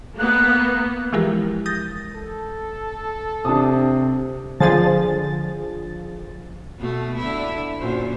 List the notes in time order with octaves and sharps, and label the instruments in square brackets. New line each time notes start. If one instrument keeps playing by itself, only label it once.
[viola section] A#3 B3 [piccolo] F#6
[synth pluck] E3 F3 G#3 E4 G4 A#4
D#6 G6 A6 A#6
[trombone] A4
[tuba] C3 [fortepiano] D4 A5 D#6
[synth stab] D3 F3 G#4 A6
[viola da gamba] B2 A3
D3 E4
F#2 A#2 C5